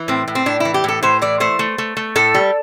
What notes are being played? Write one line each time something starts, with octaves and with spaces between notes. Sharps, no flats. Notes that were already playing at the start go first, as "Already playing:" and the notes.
Already playing: E3
A2 C4
A2
C4
A2 D4
E4
E3
G4
A2 A4
A2 C5
E3 D5
A3 C5
A3
A3
A3
A2 A4
G3